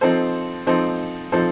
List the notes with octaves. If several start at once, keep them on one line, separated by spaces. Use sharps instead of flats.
F3 C4 D#4 A4 C5
F3 C4 D#4 A4 C5
F3 C4 D#4 A4 C5